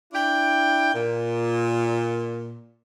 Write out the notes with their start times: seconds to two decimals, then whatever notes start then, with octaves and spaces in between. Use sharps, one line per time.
0.13 D4 E4 G5
0.94 A#2